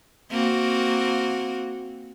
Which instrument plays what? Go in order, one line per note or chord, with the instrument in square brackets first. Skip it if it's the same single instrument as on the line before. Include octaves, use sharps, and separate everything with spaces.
[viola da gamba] A#3 C4 F#4